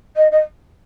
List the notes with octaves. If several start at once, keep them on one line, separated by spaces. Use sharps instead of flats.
D#5
D#5